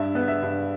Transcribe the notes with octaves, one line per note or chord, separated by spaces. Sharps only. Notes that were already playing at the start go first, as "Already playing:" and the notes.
Already playing: G2 E5
B3
E5
G2